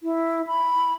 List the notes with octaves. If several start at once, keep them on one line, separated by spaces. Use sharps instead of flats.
E4
B5